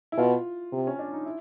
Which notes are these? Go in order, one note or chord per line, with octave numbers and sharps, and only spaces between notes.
E4
B2 F4
C3
C#4
D4
D#4
E4